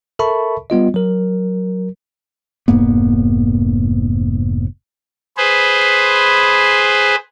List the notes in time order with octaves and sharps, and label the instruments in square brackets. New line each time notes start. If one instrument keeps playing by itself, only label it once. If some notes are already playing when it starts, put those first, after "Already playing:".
[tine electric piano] A4 A#4 E5 A5 B5 C#6
G3 B3 F4 D#5
F#3 A#4
[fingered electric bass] F1 G#2 A#3 B3
[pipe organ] G#4 B4 C5